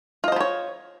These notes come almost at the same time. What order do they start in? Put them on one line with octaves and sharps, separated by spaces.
F4 D#5 C5 B3 C#5